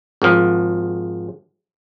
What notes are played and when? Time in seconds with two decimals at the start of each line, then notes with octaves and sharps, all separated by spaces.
0.22 G#1 F3